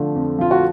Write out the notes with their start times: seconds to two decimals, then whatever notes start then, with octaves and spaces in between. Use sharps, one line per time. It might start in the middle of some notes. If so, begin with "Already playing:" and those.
Already playing: D3 F3 A3
0.15 F2
0.39 F3 F4
0.51 F#4